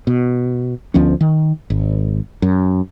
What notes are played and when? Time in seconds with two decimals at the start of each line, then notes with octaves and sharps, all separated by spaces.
0.07 B2
0.94 D2 F3 B3 C#4
1.21 D#3
1.70 G#1
2.42 F#2